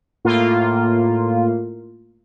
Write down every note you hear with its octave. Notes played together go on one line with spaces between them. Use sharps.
A2 A#3 F4